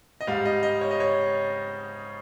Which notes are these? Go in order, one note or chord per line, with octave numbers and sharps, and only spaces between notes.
D#5
G#2 G3 F5
D#5
D#5
C#5
D#5
C#5